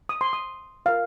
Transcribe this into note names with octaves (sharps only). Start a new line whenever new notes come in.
D#6
C6
D#6
F4 A#4 F5